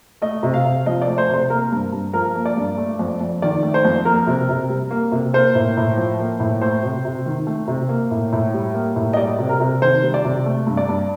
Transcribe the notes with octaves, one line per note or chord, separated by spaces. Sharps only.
A3 D#5
C3
F5
C3
F3 D#5
D5
A3
C5
C3 C5
A#3 A#4
G2
G2
F3 A#4
A#3
D5
G2
A3
F2
F2
D#3 D5
A3
C5
F2
A#3 A#4
C3
C3
G3
A#3
C3
A#3 C5
A2
A2
F3
A#3
A2
A3 C5
C3
C3
D#3
A3
C3
A#3
A2
A2
G3
A#3
A2
D#5
G3 D5
C3
A#4
C3
D#3 C5
G3
D5
C3
A3
G2
D5
G2